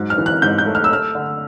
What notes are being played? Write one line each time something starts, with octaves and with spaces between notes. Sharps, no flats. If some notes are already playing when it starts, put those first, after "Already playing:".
Already playing: G#2 F#3
F6
E3
F#6
G#2 G6
G6
A3
F6
E6
A3 F6
D3